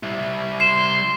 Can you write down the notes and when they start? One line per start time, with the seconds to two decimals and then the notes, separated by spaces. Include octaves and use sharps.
0.03 G3 E4
0.60 C6 C7 E7